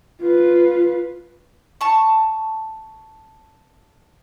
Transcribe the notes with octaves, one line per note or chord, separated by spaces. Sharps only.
F4 B4
A5 C#6